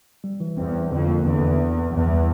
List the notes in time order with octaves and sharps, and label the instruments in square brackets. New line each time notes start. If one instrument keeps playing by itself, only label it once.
[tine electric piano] G3
E3
[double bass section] E2 [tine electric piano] C4
[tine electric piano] C4
[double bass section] F2 [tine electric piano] D3
[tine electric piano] A#3
[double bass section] E2 [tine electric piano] D3
[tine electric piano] D3
B3
B3
[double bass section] E2 [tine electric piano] E3
[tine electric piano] G3